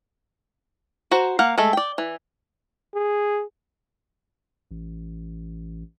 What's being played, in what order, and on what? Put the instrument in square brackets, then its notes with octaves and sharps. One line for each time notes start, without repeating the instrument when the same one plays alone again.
[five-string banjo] F#4 C5 A#5
A#3 F5 F#5
G#3 A3 A4
D5 G5
E3
[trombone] G#4
[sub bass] A1